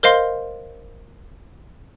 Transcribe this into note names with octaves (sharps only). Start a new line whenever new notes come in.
A#4 C5 D#5 F5 C6